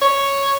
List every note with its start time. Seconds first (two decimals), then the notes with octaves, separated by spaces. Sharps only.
0.02 C#5